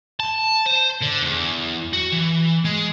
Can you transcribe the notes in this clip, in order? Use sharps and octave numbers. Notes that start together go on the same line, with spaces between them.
A5
C5
D3
E2
F#4
E3
G#3